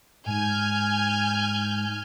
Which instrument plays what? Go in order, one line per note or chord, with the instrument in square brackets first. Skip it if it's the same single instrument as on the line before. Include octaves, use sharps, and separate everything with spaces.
[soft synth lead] G#2 [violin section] G#5 F6 G6